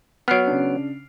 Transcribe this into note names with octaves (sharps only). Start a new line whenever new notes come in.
F#3 B3 F6 C7 D7
C#3 D4